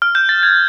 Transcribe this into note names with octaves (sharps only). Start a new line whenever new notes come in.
F6
G6
A6
G#6